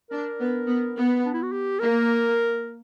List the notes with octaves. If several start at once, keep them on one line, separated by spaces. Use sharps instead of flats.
D4 A#4
B3
B3
B3
D4
E4
F#4
G4
A#3 A#4